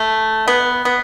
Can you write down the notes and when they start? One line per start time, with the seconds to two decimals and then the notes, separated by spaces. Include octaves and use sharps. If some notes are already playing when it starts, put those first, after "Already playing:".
Already playing: A3
0.48 B3
0.85 B3